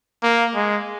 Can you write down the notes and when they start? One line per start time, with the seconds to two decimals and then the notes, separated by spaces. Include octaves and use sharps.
0.23 A#3
0.55 G#3